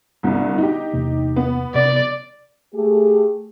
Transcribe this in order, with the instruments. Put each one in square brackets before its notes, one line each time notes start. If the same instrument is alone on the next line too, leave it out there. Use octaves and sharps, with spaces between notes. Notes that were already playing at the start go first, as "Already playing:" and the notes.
[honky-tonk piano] G1 C2
D#4 G4
[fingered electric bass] E2 C3 A#3
[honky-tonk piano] B3
[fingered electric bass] C3 [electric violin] D5
[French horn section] A3 G4 G#4